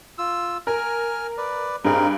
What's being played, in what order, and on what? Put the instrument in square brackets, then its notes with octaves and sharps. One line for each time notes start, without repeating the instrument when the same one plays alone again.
[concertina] F4 E6
[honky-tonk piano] A#4 [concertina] G#5 F6
[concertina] B4 D5
[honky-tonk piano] G2 G#4 [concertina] C4 D#4 A#4